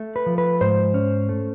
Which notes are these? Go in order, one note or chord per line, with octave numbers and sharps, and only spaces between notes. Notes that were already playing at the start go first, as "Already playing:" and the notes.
Already playing: A3
B4
F3
B4
G#2 C5
C#4
A3